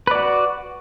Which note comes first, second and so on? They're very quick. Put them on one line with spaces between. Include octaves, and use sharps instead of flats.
B4 D5 F#4